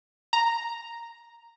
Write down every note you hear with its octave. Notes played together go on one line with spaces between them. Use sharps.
A#5